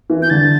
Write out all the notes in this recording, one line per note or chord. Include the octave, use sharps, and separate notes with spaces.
E3
G6
D3 A6